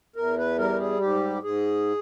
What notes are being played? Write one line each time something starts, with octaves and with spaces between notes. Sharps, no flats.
E2 A#4
B4
G3 A#4
G#4
G#2 G4
G#2 G#4